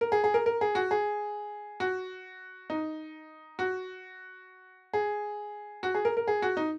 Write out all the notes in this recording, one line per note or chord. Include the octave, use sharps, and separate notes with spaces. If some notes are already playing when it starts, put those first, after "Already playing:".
A#4
G#4
G#4
A#4
A#4
G#4
F#4
G#4
F#4
D#4
F#4
G#4
F#4
G#4
A#4
A#4
G#4
F#4
D#4